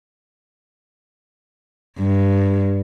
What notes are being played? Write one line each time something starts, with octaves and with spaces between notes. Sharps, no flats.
G2